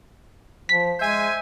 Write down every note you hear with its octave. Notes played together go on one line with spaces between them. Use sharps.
F3 B6
G#3 C5 E5 G#5